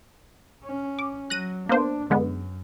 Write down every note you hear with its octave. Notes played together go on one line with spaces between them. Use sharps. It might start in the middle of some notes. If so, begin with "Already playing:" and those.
C#4
D6
F#3 F#6 A#6 D#7
A#3 B3 D4 C5
F#2 D3 G#3 B3